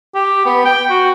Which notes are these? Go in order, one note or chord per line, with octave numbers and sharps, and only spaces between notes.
G4
B3
G5
F#4